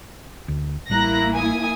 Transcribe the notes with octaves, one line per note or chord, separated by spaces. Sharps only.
D2
A1 G3 A#3 E4 A#5 F#6 A#6
G#5 D#6